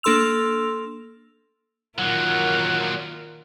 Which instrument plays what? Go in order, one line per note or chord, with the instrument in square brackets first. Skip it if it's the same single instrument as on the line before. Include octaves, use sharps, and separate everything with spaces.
[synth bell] A#3 D4 A4 C6 E6 F7
[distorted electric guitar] A#2 F#3 [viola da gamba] D#3 F4 A#4 [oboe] F#5